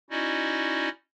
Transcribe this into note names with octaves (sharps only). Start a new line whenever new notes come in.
C#4 D#4 E4 F#4 D5 D#5